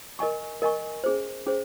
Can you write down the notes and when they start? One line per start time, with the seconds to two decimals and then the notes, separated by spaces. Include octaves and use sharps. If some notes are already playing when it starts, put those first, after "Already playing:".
0.19 A#4 D#5 G#5 C#6
0.62 A#4 D#5 G#5 C#6
1.04 C#4 G#4 C5
1.46 C#4 G#4 C5